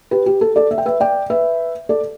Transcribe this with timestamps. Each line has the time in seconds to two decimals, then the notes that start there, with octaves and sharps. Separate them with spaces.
0.11 G4 B4
0.26 G4
0.41 A4
0.56 A4 D5
0.71 E5
0.78 G5
0.86 B4 E5
1.00 D5 G5
1.30 B4 E5
1.89 A4 D5